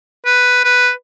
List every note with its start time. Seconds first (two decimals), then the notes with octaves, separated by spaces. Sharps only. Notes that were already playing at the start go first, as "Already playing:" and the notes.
0.26 B4
0.64 B4